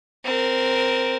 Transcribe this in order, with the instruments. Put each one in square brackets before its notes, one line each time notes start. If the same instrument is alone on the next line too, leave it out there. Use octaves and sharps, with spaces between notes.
[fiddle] C4 A#4